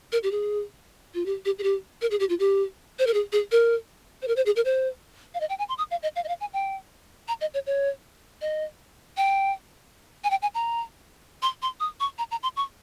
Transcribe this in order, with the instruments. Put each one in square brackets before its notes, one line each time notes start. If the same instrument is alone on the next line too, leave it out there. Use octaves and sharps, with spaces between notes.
[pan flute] A#4
G4
G#4
F4
G4
G4
G#4
G4
A#4
G#4
G4
F4
G4
C5
A#4
G#4
G#4
A#4
C5
A#4
C5
G#4
A#4
C5
F5
D#5
G5
G#5
C6
D#6
F5
D#5
F5
D#5
F5
G#5
G5
A#5
D#5
C#5
C#5
D#5
G5
G#5
G5
G#5
A#5
C6
C6
D#6
C#6
A#5
A#5
C6
C#6